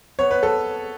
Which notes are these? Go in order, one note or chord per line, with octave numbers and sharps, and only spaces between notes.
B3 C#5
B4
A4